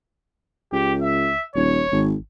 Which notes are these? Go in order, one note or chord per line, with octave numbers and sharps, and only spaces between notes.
C#2 G4
E5
D#1 C#5
G#1